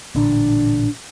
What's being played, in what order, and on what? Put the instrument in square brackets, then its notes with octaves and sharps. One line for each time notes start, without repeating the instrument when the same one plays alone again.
[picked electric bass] A1 A#2 D3 [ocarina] D4